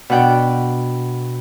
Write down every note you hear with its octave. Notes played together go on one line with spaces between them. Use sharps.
B2 D4 F#5 G5